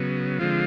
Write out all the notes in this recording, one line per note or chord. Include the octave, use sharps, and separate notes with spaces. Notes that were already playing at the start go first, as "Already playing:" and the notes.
Already playing: C#3 F#3 B3
D3 F3 G#3 C4 F4